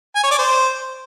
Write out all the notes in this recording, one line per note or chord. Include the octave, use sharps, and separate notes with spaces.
G#5
C#5
D5
C5